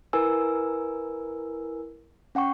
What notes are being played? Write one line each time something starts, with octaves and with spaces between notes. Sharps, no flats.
E4 A#4 B4 G#5 E6
C#4 F#5 G5 C#6